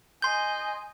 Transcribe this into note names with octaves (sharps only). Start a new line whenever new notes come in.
D#5 G#5 C6 G6